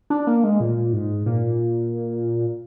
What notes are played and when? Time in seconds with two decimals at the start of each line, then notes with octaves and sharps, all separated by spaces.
0.10 D4
0.27 A#3
0.44 G#3
0.60 A#2
0.93 G#2
1.26 A#2